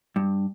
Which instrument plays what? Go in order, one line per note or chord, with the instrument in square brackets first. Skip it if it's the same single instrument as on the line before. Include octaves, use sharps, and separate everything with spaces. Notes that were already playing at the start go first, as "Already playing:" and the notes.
[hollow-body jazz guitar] G2